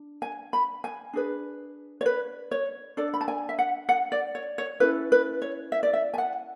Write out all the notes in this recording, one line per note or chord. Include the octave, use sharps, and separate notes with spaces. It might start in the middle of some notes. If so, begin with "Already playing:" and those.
Already playing: D4
G#5
B5
G#5
D4 G#4 B4
C#5
B4
C#5
D4 A4 D5
B5
A5
G#5
E5
F#5
F#5
D5
C#5
C#5
C#4 E4 A4 B4
B4
C#5
E5
D5
E5
G#5
F#5